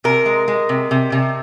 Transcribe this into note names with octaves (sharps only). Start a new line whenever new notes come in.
C3 A#4
G#3
G#3
C3
C3
C3